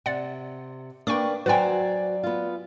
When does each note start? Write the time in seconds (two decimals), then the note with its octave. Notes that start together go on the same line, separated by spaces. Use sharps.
0.06 C3 D5 F#5
1.07 A#3 D4 B4 G5 C#6 D6
1.46 F#3 F#4 B4 C5 D5 G5 G#5 A#5
2.23 B3 F4